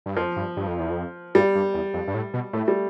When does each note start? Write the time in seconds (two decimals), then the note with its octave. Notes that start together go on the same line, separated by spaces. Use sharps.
0.06 G2
0.17 F2 F3
0.36 G2
0.57 G2
0.68 F2
0.79 E2
0.90 F2
1.35 G2 G3
1.55 G2
1.74 E2
1.94 F2
2.07 G2
2.14 A2
2.34 B2
2.53 A2 A3
2.68 G3